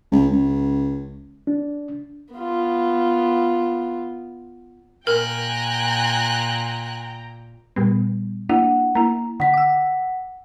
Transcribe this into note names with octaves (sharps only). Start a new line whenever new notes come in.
C#2
C#2
D4
B3 F4
A#2 A#4 G5 G#5 A#5 F#6
A#2 G3 B3
A#3 D4 E4 F#5
A#3 E4 A#5
D3 F#5 B6
D6 E6